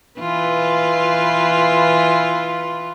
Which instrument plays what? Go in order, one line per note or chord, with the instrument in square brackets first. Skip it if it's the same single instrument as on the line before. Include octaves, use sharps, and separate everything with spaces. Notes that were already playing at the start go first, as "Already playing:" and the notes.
[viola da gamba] E3 F4 B4